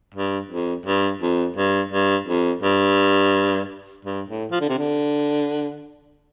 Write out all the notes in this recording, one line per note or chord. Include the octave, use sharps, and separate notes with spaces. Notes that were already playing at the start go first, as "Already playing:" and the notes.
G2
F2
G2
F2
G2
G2
F2
G2
G2
A2
F3
D3
C3
D3